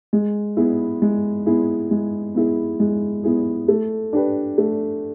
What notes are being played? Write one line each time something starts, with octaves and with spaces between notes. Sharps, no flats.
G#3
B3 E4 G#4
G#3
B3 E4 G#4
G#3
B3 E4 G#4
G#3
B3 E4 G#4
A3
D4 G4 B4
A3